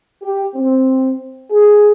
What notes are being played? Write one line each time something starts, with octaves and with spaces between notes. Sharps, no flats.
G4
C4
G#4